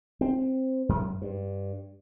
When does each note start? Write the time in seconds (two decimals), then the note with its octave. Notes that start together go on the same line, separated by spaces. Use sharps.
0.21 C4
0.89 F#2
1.22 G2